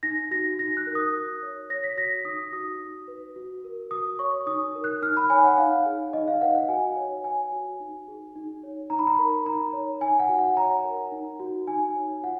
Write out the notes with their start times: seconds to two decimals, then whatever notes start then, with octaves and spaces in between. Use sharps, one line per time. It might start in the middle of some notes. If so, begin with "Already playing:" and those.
0.03 D#4 A#6
0.31 F#4 A#6
0.59 D#4 A#6
0.77 F#6
0.87 A#4
0.95 D#6
1.14 F#4
1.42 C#5
1.70 C#5 A#6
1.84 B6
1.97 F#4 A#6
2.25 D#4 D#6
2.52 F#4 D#6
2.80 D#4
3.08 B4
3.36 F#4
3.64 A#4
3.91 F#4 D#6
4.19 C#5 C#6
4.47 D#4 D#6
4.75 A#4
4.84 F#6
5.02 D#4 F6
5.17 B5
5.30 C#5 G#5
5.44 F#5
5.58 D#4 F5
5.86 G#4
6.13 D#4 D#5
6.28 F5
6.41 B4 F#5
6.55 F#5
6.69 F#4 G#5
6.96 C#5
7.24 C#5 G#5
7.52 F#4
7.80 D#4
8.08 G#4
8.36 D#4
8.63 C#5
8.90 D#4 A#5
8.99 B5
9.07 A#5
9.19 A#4
9.46 D#4 A#5
9.73 C#5
10.01 D#4 G#5
10.19 F#5
10.29 F#4
10.39 F#5
10.57 C#5 A#5
10.84 A#4
11.12 D#4
11.40 F#4
11.67 D#4 G#5
11.96 C#5
12.23 F4 F#5